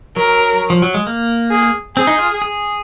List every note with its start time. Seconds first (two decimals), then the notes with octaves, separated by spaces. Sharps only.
0.16 F#3 A#4
0.70 F3
0.82 F#3
0.94 G#3
1.07 A#3
1.51 G#4
1.96 C4 G#4
2.07 D#4
2.18 F4
2.42 G#4